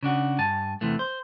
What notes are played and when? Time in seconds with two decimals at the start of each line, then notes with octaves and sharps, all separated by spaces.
0.03 C#3 D4 F#4
0.38 G2 G#5 A5
0.81 E2 C3 E3 A3
0.99 C5